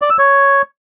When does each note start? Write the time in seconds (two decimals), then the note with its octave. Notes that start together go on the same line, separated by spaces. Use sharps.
0.02 D5
0.10 E6
0.18 C#5